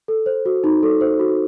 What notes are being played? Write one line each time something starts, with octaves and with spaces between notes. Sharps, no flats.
A4
C5
F#4
D#4
A4
C5
F#4